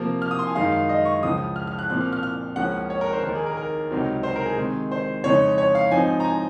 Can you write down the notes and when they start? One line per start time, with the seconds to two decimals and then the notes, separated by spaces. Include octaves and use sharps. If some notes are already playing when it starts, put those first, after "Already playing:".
Already playing: C3 F3 A#3
0.22 F6
0.31 D#6
0.39 C6
0.47 G#5
0.55 F#2 D#3 G#3 D#4 F5
0.72 F5
0.89 D#5
1.05 C#6
1.23 C#2 C#3 F3 D#6
1.56 F6
1.67 F6
1.79 F#6
1.90 A#2 F3 C4 F#6
2.01 F6
2.13 F6
2.23 F6
2.56 C#2 C#3 F3 A#3 C#4 F#5
2.90 C#5
3.01 A#4
3.13 C5
3.23 D#2 D#3 A#3 A#4
3.35 G#4
3.46 A#4
3.57 A#4
3.91 C#2 C3 F#3 C4 D#4
4.23 C5
4.36 A#4
4.46 G#4
4.57 C3 D#3 G#3
4.92 C5
5.24 F2 C#3 G#3 D#4 C#5
5.58 C#5
5.75 F5
5.91 G#2 F3 C4 D#4 G#5
6.20 A#5
6.24 G#5